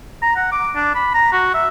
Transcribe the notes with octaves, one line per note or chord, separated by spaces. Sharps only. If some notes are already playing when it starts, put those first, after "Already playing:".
A#5
F#5
D6
D4
B5
A#5
F#4
E5